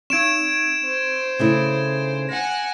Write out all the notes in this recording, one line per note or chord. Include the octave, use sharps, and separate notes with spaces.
C4 D#4 G#6 D7 E7
C5
C#3 A3 E4
F#5 G#5 A#6